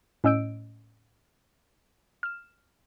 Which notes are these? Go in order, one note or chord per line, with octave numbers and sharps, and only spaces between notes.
A2 C#4 D#5 E6 G6 D7
F6 E7